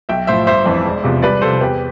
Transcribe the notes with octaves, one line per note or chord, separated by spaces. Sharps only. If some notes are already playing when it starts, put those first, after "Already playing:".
B1 E5 G5
A2 F3 C5 E5
G1 C5 E5
F2 E3
E1
E2 C3 F3
C2 B4 D5
C3 F3 A4 C5
E2 G4 B4